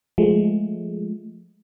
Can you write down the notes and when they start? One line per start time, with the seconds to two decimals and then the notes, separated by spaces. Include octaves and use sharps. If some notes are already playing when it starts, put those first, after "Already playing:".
0.18 F3 G#3 A3